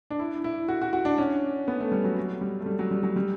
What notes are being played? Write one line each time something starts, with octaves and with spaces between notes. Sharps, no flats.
D4
E4
E4
F#4
F#4
F#4
D4
C#4
B3
A3
G3
F#3
F#3
G3
A3
G3
F#3
G3
F#3
G3